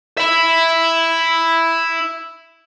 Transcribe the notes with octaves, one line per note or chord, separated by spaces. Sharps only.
E4 E5